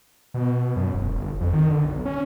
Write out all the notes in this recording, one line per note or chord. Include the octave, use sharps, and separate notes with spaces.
B2
F#2
E1
G1
F2
D#3
D3
B1
C#4